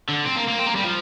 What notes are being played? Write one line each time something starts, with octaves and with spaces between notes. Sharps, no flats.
D3
C4
A#3
A#3
C4
A#3
G3
F3